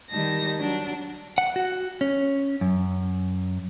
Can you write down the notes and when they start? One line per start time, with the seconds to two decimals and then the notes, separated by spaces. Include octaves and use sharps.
0.11 D#3 G3 D#4 A5 A#6
0.59 F#3 D4
1.38 F#5
1.56 F#4
2.01 C#4
2.61 F#2